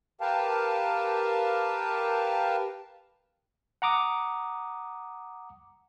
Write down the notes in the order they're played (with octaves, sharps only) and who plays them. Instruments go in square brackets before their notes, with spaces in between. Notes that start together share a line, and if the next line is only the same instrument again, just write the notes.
[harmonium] G4 A#4 B4 F5 G5 A5
[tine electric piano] F#5 A#5 D6 D#6